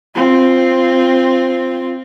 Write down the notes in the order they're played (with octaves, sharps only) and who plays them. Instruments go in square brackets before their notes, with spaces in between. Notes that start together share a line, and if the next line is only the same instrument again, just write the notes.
[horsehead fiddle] C4 F4